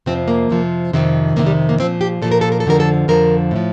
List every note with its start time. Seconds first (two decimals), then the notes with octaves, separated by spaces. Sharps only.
0.06 F2 C3 F3 C4
0.28 A#3
0.49 F2 C3 F3
0.93 F2 C3 D#3
1.36 F2 C3 D#3 A#3
1.46 G3
1.69 A#3
1.80 A#2 F3 C4
2.01 G4
2.22 A#2 F3 A4
2.32 A#4
2.41 A4
2.52 A#4
2.60 A4
2.66 F2 D3 F3 A#4
2.80 A4
3.08 F2 D3 F3 A#4
3.51 A2 F3